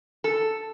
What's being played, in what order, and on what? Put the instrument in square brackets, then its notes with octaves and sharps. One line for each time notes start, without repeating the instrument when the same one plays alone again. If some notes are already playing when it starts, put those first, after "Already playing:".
[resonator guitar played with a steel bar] A4